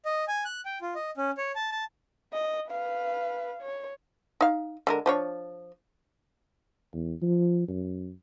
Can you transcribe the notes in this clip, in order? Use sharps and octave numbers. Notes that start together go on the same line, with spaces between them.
D#5
G#5
F#6
G5
F4
D#5
C#4
C#5
A5
A5
D#5
B4 F5
C#5
D#4 F5
D3 G#3 A#4
F3 D4 C#5
E2
F3
F#2